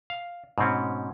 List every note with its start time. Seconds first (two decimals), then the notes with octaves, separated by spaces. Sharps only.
0.10 F5
0.58 G#2 B2 C4 C#4